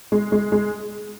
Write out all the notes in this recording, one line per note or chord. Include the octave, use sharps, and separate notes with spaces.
G#3
G#3
G#3